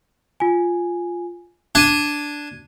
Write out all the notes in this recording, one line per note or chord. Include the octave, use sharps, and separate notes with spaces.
F4 G#5
D4 G#6 D#7